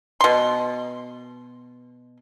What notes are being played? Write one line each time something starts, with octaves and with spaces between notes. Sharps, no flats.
B2 C6